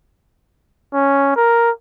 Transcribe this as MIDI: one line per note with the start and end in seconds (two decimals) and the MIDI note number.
0.93 1.32 61
1.36 1.70 70